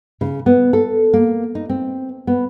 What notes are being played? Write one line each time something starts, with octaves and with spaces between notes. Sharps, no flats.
C#3
B3
A4
A#3
D#4
C4
B3